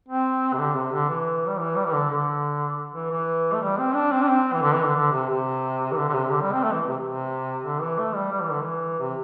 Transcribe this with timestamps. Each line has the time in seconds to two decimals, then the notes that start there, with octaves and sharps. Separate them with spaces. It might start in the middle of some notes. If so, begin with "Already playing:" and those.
0.08 C4
0.54 C3
0.59 D3
0.75 C3
0.92 D3
1.09 E3
1.48 G3
1.60 E3
1.76 G3
1.86 E3
1.93 D3
2.10 D3
2.94 E3
3.11 E3
3.53 A3
3.62 G3
3.78 C4
3.95 D4
4.12 C4
4.23 D4
4.28 C4
4.53 E3
4.62 D3
4.74 E3
4.85 D3
4.96 D3
5.12 C3
5.30 C3
5.92 E3
5.97 D3
6.09 D3
6.13 C3
6.31 D3
6.42 G3
6.52 C4
6.64 A3
6.72 E3
6.89 C3
7.04 C3
7.65 D3
7.82 E3
7.99 A3
8.15 G3
8.32 G3
8.42 E3
8.52 D3
8.61 E3
9.00 C3